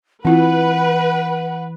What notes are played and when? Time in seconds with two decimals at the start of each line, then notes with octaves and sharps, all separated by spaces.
0.25 E3 C4 E4 F4 B4 F#5